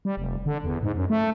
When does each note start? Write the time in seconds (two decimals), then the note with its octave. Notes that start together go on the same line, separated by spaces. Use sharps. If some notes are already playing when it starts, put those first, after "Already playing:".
0.05 G3
0.17 F1
0.46 D3
0.64 E2
0.83 G#2
0.96 F#2
1.10 A3